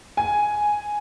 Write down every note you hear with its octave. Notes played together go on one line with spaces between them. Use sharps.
G#5